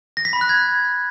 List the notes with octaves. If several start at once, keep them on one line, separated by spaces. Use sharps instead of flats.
A#6
B6
B5
F#6
G#6